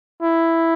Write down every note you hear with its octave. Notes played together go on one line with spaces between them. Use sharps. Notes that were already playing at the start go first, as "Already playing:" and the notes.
E4